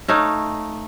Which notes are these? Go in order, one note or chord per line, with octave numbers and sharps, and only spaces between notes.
A3 D#4 C#5 F5